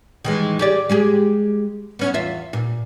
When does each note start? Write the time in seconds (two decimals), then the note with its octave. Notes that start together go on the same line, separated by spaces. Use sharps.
0.24 D#3 E3 G#3
0.59 G4 G#4 D5
0.89 G#3 G4 G#4
1.99 B3 C#4
2.14 E2 F4 E5
2.53 A#2